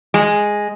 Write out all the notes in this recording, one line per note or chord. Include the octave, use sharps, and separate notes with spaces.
G#3